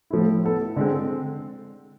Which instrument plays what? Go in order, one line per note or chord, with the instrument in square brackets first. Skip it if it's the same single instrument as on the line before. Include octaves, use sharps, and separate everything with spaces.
[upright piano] A2 F3 A3 E4
B3 E4 A4
D3 G#3 C4